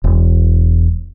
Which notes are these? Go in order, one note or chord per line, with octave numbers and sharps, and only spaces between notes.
E1